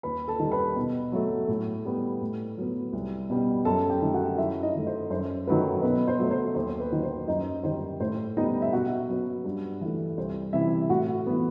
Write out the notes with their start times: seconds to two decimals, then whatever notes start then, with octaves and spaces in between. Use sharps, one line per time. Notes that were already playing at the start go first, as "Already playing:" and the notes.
0.03 D#2 B4 B5
0.28 A4 A5
0.40 D#3 G3
0.52 B4 B5
0.76 B2
1.12 F#3 A3
1.48 A2
1.85 G3 B3
2.21 A2
2.57 F#3 B3
2.93 C2
3.30 B2 G3 B3
3.65 F#2 A4 A5
3.90 G4 G5
4.02 D#3 A3
4.14 F#4 F#5
4.38 F#2 E4 E5
4.63 D#4 D#5
4.75 D#3 A3
4.87 C5
5.10 F#2 C5
5.47 D#3 F#3 A3 B4
5.82 B2 B4
6.08 C5
6.19 F#3 A3
6.31 C5
6.55 D#2 C5
6.80 B4
6.92 D#3 F#3
7.03 C5
7.27 F#2 D#4 D#5
7.63 D#3 G3 C5
8.00 A2 C5
8.37 G3 B3 D#4 D#5
8.62 E5
8.73 B2 F#4 F#5
9.09 F#3 B3
9.45 G2
9.81 E3 A3
10.18 C2 C5
10.53 C3 E3 E4 E5
10.89 A2 F#4 F#5
11.26 E3 B3